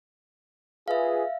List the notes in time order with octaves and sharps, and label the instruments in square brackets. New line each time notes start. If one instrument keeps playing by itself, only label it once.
[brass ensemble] F4 G#4 B4 [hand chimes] E5 F5